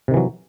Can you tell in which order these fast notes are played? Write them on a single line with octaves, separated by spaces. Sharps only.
C3 D#3 E3 F#3